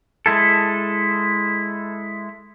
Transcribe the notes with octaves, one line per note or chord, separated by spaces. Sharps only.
G#3 E4 A4